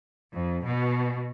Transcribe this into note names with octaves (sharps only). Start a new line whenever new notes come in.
F2
B2